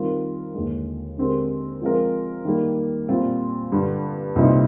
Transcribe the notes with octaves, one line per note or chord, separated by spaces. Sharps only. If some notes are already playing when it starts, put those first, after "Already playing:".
Already playing: D#3 G3 C4 F4 A#4
D#2 D3 G#3
D3 G#3 C4 G4 A#4
F3 G#3 C4 F4 A#4
D#3 G3 A#3
A#2 G3 C4 F4
G2 D3 G3
C2 A#2 G3 C4 D#4